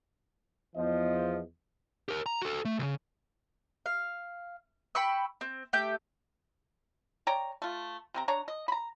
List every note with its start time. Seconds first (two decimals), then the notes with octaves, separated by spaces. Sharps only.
0.76 E2 F3 D#5
2.09 G4 A#4
2.26 A#5
2.42 F#4 A4
2.65 A3
2.79 C#2 C#3
3.86 F5
4.95 G5 B5 C#6 E6
5.41 C4
5.73 A3 G4 G6
7.27 C#5 D5 G5 A#5
7.62 A3 F4
8.14 C3 C4 A#5
8.28 D4 C#5 A#5
8.48 D#5
8.68 A#5 B5